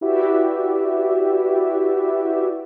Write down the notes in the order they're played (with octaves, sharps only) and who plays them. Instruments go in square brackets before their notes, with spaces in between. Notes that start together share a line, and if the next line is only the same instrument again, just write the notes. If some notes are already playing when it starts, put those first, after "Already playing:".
[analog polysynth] E4 F#4 G4 B4 D5 E5